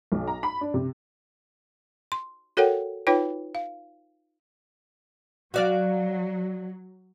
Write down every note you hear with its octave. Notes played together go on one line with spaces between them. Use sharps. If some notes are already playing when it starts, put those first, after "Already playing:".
B1
A#5
B5
D4
C3
C6
F#4 A4 A#4 C#5 F#5 G5
D#4 F4 B4 C#5 G5
F5
F#3 F#4 D5 F5